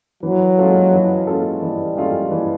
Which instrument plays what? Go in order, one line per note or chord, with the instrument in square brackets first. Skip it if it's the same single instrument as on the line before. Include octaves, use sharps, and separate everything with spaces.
[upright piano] E3 [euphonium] F#3
[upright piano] G#3 C#4 F4 A4
E3
G#3 C#4 F4 A4
[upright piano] E3 [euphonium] G3
[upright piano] G#3 C#4 F4 A4
E3